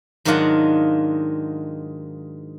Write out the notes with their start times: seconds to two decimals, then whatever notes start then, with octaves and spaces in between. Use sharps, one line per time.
0.25 G#2 D#3 F#3 D4 F4 F#5